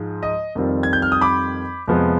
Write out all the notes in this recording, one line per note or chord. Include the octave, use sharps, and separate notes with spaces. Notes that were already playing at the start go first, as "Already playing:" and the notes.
Already playing: G#2 F3 G#3
D#5
F2 D#3 G3 C4 F4
G#6
G6
F6
D#6
B5 D6
F2 C3 F3 G#3 B3